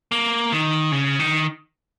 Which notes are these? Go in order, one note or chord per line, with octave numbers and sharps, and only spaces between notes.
A#3
D#3
C#3
D#3